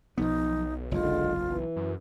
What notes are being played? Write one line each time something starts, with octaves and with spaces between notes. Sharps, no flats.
B1 F3 F#3 B3 D#4
F#1 E2 D3 G#3 F4
E3
F#2